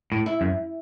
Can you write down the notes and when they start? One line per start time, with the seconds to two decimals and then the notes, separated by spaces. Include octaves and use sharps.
0.12 A2
0.26 E4
0.41 F#2